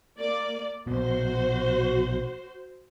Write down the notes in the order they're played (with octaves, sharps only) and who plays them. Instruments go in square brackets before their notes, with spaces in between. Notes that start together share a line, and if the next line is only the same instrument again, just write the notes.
[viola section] A#3 D5
[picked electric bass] A#1 B2 [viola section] F#4 C5